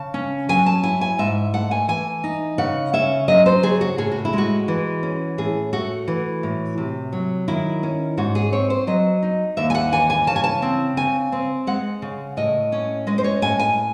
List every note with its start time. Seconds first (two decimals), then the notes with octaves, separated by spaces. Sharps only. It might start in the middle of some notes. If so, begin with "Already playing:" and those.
Already playing: C#3 A5
0.14 C#4
0.49 F#3 G#5
0.66 A5
0.83 E4 G#5
1.01 G#5
1.19 G#2 E5
1.54 A3 F#5
1.71 G#5
1.88 E3 G#5
2.24 D#4
2.58 C#3 F#5
2.93 C#4 E5
3.28 F#3 D#5
3.46 C5
3.63 C#3 G#4
3.81 F#4
3.98 A2 G#4
4.12 F#4
4.25 E4
4.33 G#3 F#4
4.68 E3
5.03 C#4
5.38 A2 G#4
5.73 A3 F#4
6.08 E3
6.43 A2
6.78 C3
7.13 F#3
7.48 D#3 E4
7.83 C#4
8.17 G#2 F#4
8.35 G#4
8.53 C4 C#5
8.70 C5
8.87 F#3 D#5
9.22 D#4
9.57 D#2 E5
9.70 G#5
9.75 F#5
9.92 E3 G#5
10.10 G#5
10.27 C#3 A5
10.36 G#5
10.44 A5
10.62 C4
10.97 C#3 G#5
11.32 C4
11.67 G#3 F#5
12.02 C#3
12.37 A2 D#5
12.72 C#4
13.07 G#3 D#5
13.18 C5
13.24 C#5
13.42 A2 G#5
13.59 G#5